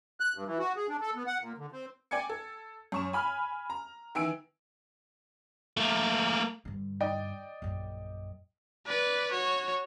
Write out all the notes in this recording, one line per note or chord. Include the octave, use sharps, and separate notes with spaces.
F#6
G2
E3
F#4
G#4
D4
A4
B3
F#5
A#2
D3
C4
D5 G5 G#5 G#6 C#7
A4
F#2 C#6 E7
G#5 B5 F6
A#5
D#3 E3 G#5 E6 D7
A3 A#3
G2 D3
D5 D#5 G5
A#1 F#2
B4 D5
F#4 C#5